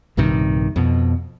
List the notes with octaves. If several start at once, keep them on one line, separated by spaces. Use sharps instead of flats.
A#1 G2 C3 D#3
F2 B2